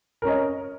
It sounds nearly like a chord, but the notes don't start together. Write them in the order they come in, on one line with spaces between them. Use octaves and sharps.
A#4 C#4 D#5